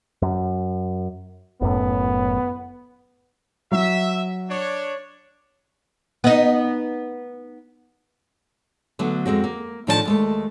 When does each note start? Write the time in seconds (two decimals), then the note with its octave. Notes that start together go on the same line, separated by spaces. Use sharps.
0.22 F#2
1.62 F#1 F#2 A2 B3
3.72 F#3 E5
4.49 D4 C#5
6.24 B3 D#4
8.99 D3 F#3 A3 B3
9.26 F2 G#3 C4 F#4
9.44 A#3
9.87 A2 D#3 F3 D4 G4 A5
10.05 D#2 G#3 A3